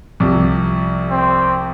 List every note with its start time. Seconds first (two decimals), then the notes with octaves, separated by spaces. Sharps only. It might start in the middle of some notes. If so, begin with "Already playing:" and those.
0.20 C2 C3 F3
1.10 C4